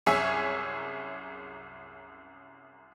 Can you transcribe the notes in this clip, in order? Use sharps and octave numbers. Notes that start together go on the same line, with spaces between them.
C2 F#2 G#4 C#5 E5 G#6